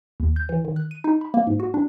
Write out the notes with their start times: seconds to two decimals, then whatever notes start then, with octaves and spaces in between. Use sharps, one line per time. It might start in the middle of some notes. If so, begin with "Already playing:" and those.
0.20 D#2
0.36 G6
0.49 E3
0.65 D#3
0.76 F#6
0.91 D#7
1.04 D#4
1.21 B5
1.34 A#3
1.47 G#2
1.60 F#4
1.74 D4